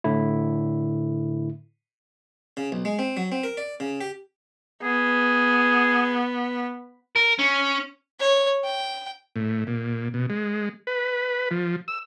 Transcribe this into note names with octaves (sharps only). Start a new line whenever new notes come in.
A2 D3 E4
C#3
B1
G#3
C4
F#3
C4
A#4
D5
C#3
G4
B3 G#4
A#4
C#4
C#5
G5
A2
A#2
B2
G#3
B4
F3
E6